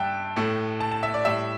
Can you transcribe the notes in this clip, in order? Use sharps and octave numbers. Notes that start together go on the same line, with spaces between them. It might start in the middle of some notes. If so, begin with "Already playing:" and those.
Already playing: G2 G3 E5 G5 A5
A2 A3
A5
A5
E5
D5
A2 G3 E5